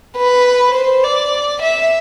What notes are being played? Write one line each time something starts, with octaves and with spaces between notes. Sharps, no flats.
B4
C5
D5
E5